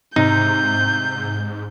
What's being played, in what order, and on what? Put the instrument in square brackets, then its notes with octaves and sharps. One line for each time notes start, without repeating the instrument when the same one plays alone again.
[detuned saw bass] G#2 [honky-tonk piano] C3 [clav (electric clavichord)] D#4 [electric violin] G6